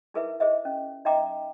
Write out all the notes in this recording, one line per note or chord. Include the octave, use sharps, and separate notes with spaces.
D#4 E4 G#4 A#4 B4 E5
G#4 C5 D#5 E5
C#4
D#4 D#5 E5 G5 A#5 D6